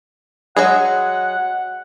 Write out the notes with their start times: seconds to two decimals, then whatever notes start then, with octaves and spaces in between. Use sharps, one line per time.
0.57 F#3 G#3 G#4 F#5